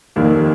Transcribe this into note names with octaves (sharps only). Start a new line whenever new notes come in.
F1 D#2 D#3 G3 A#3